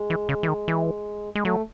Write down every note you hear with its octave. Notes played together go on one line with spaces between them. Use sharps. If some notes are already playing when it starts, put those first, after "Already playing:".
Already playing: G#3
E3
C#3
E3
D#3
E3
G#3
F#3 A3